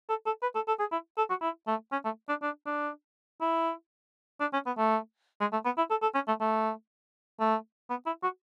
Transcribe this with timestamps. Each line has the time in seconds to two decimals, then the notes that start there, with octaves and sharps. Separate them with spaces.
0.09 A4
0.26 A4
0.42 B4
0.55 A4
0.68 A4
0.79 G#4
0.92 E4
1.17 A4
1.29 F#4
1.41 E4
1.67 A3
1.92 C#4
2.04 A3
2.29 D4
2.42 D4
2.66 D4
3.41 E4
4.40 D4
4.53 C#4
4.66 B3
4.78 A3
5.40 G#3
5.52 A3
5.65 B3
5.77 E4
5.90 A4
6.02 A4
6.14 C#4
6.28 A3
6.40 A3
7.40 A3
7.90 B3
8.06 E4
8.23 F#4